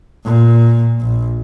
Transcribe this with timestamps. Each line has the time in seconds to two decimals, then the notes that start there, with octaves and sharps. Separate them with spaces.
0.24 A#2
1.01 A#1